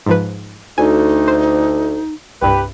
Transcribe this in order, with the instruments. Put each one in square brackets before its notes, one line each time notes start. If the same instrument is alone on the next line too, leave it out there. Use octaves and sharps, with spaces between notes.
[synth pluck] G#2 F3 B4
[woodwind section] D2 [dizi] D#4 [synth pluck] G#5
[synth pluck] C5
[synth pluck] C2 G2 [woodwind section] G4 B4